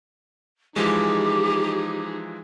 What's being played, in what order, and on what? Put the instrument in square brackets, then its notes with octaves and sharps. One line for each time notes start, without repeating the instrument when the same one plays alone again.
[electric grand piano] E3 F3 G#3 [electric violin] D#4 G#4 [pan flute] G4